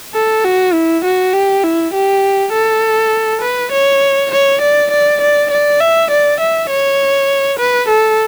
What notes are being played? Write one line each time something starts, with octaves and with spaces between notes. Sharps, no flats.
A4
F#4
E4
F#4
G4
E4
G4
A4
B4
C#5
C#5
D5
D5
D5
D5
E5
D5
E5
C#5
B4
A4